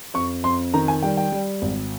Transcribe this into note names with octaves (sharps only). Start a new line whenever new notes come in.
F2 C#6
F2 C6
D#3 A#5
G#5
G3 G5
G5
G3
G#1